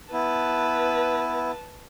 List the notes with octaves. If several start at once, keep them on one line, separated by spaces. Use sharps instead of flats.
B3 E4 B4 A5